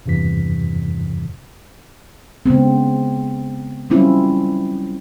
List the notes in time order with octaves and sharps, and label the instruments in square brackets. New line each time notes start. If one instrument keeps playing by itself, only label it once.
[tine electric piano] E2 G2 C3 E3 B6
[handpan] C#3 G#3 B3 C4
F#3 G3 C4 C#4 E4 F4